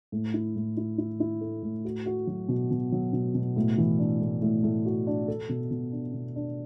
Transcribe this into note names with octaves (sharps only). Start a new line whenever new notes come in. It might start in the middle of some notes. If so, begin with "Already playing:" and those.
A2
E4
A2
E4
E4
E4
A3
A2
F#4
F#4
F#3
B2
B2
F#3
B2
B2
A2
E3
D4
A2
A2
A2
F#4
D4
A4
B2
B2
D4
B2
D4